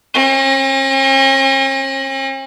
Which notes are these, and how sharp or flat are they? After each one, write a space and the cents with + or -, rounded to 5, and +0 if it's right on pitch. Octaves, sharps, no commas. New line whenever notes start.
C#4 -45